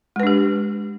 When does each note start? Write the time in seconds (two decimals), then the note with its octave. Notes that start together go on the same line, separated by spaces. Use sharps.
0.16 G#3
0.20 B4
0.23 D4
0.27 G4